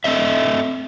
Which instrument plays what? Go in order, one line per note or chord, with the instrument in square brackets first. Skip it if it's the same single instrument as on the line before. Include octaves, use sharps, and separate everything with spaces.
[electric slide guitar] A3 C4 D#5 E5